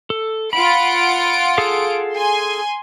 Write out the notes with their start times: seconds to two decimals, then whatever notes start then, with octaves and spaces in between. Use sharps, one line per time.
0.10 A4
0.53 F4 F#5 B5 D7
1.58 G#4 A4 F5
2.15 G#5 C6